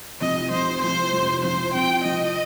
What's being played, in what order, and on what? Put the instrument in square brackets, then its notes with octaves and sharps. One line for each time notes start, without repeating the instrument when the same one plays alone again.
[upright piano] F1 F2 C3 F3 [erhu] D#5
[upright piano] F1 F2 C3 F3 [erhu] C5
[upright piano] F1 F2 C3 F3 [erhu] C5
[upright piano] F1 F2 C3 F3
[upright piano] C3 F3 C4 [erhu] C5
[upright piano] C3 F3 C4 [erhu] G5
[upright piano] C3 F3 C4 [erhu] D#5